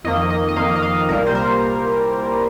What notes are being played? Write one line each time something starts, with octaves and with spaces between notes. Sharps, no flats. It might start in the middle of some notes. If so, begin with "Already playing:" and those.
F2 D#3 A#3 D#5
D#5
D#5
F2 D#3 A#3 F5
D#5
F5
C2 A#2 G3 A#3 A#4
C5
A#4